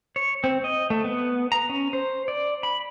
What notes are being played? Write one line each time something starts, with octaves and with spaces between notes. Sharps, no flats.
C#5
C4
D#5
A3
B3
A#5
C#4
C5
D5
B5